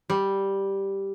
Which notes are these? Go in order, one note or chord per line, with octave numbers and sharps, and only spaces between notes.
G3